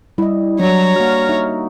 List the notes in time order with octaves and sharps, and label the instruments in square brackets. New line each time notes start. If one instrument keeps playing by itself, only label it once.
[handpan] G3 D#5 [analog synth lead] E4
[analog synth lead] F#3 [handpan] D4 F#4 [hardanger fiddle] C#5 A#5
[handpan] A#3 F#4 [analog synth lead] F6
[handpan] D#4 E5